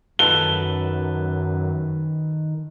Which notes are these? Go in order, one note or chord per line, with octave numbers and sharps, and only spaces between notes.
F#2 D#3 A4 B4 G7